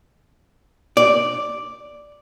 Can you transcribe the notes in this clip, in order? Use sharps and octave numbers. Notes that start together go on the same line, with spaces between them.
D5